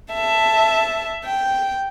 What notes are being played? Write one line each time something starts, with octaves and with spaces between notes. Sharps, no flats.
E5 A5
G5